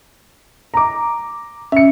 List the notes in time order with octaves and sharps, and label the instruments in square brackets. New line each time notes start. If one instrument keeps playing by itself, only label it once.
[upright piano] A#5 D6
[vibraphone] C#4 [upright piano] E5 C#7